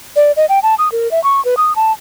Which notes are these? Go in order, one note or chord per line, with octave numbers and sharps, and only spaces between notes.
D5
D#5
G5
A5
D#6
A#4
E5
C#6
B4
D#6
A5